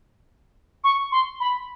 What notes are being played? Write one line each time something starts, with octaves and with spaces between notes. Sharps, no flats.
C#6
C6
B5